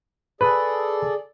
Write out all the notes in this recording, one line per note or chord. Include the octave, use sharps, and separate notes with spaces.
G#4 A4 B4 D5